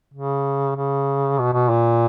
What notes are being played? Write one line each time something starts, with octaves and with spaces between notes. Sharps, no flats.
C#3
C#3
B2
B2
A#2